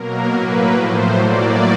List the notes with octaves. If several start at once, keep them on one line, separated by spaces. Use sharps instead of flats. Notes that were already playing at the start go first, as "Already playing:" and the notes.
Already playing: B2 F#3 A#3 A#4
A2 F#3 A#3 B4
A2 F3 A3 C5
A2 F#3 A#3 D5